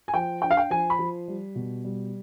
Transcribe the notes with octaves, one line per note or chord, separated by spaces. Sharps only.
G#5
F3 G5
D4 G5
F5
G5
F3 G#5
B5
F3
G3
B2
G3